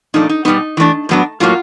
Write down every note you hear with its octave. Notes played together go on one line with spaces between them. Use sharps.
A#2 F3 A3 D4 D#4
D#4
B2 G3 B3 D#4
E3 A3 D4
A2 F#3 B3 D4
A2 F#3 A#3 F4